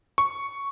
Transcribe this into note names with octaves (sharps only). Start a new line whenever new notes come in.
C#6